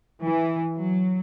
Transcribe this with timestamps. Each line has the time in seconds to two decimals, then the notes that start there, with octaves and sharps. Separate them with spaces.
0.23 E3
0.74 F#3